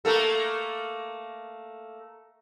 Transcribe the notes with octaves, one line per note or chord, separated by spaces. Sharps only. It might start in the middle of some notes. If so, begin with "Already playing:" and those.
A3 A#3 A4